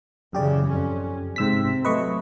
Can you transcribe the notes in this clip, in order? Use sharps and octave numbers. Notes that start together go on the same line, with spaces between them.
F#2 C#3 E3 G4 D5
F2 C#4
G#2 C3 C4 E6 B6
F#3 A3 B4 D#5 C#6